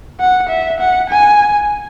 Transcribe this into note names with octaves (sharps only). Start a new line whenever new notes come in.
F#5
E5
F#5
G#5